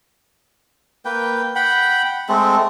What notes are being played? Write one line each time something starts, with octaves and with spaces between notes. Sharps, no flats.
A#3 B4 G5
F#5 G5 B5
G#3 A3 C4 A4